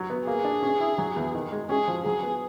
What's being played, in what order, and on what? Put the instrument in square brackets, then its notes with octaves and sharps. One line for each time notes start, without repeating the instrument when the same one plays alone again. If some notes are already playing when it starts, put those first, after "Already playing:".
Already playing: [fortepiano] F#3
B3
[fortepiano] A#3 [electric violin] G#4
[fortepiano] D4
C#4
E4
F#3
E2
D#3
G#3
[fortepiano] C#4 [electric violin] G#4
[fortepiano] F3
[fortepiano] F#3 [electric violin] G#4
[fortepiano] B3